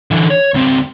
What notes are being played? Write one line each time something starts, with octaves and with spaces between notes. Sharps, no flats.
D3 E3
C#5
C#2 C4